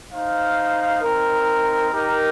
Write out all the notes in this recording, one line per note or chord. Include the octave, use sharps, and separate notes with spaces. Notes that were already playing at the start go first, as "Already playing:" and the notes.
D#4 C5 F5
C4 D#4 A#4
D#4 G4 A#4